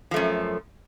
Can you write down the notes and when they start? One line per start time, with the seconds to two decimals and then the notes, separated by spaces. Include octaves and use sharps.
0.11 F3
0.14 A3
0.16 F#2